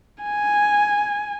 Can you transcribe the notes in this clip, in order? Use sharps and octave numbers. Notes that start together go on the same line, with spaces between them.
G#5